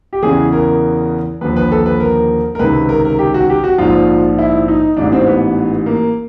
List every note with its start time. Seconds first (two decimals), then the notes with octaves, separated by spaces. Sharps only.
0.13 G4
0.23 E2 C#3 E3 G#4
0.52 A#4
1.41 D#2 D3 F3 B4
1.56 B4
1.72 A4
1.86 B4
2.00 A#4
2.55 A#4
2.59 C#2 C3 D#3 B4
2.89 A#4
3.05 A#4
3.19 G4
3.34 F#4
3.50 G4
3.64 F#4
3.78 A#1 G#2 F3 F4
4.38 E4
4.68 D#4
4.97 A1 G#2 E3 D4
5.12 C4
5.26 B3
5.86 A#3